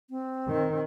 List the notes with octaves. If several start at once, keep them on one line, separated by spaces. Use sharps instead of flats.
C4
D#3